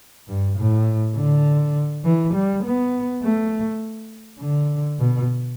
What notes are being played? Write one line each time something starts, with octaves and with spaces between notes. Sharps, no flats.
G2
A2
D3
E3
G3
B3
A3
D3
B2